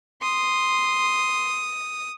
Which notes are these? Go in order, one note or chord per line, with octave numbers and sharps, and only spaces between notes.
C6 D#6